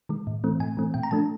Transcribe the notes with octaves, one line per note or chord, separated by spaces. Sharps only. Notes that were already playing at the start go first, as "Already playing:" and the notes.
D#3 G#3
A2
E3 A3 C4
A2 G#5
E3 A3 C4
A#2 G5
A#5
F3 A3 D4 A5